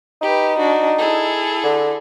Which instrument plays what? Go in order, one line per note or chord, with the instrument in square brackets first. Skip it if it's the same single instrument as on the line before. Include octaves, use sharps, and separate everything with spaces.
[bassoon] D#4 [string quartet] G4 B4
[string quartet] D4 F#4
E4 G#4 A4
[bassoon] D3